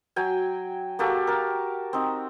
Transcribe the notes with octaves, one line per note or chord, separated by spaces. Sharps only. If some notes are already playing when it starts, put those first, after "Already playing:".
F#3 G5 G#5
A#3 F#4 G4 A4
A#4 A5
C4 D#4